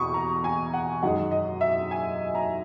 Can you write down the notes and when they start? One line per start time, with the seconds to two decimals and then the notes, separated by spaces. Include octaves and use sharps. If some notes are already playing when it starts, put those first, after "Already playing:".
Already playing: E2 B2 B5 C#6 D#6
0.14 A#5
0.44 G#5
0.73 F#5
1.03 F#2 D#3 G#3 F#5
1.31 D#5
1.61 E5
1.91 G#5
2.35 A#5